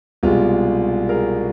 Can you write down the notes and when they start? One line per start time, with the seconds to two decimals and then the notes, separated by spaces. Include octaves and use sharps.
0.23 C2 B2 G#3 F4 G4
1.09 G#4 A#4